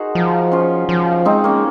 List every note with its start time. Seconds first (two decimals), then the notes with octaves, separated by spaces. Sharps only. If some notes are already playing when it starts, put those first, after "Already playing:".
Already playing: D#4 F#4 G#4 A#4 C5
0.15 F3
0.51 C#4 F4
0.89 F3
1.25 G#3 C4 D#4
1.44 A#3 C#4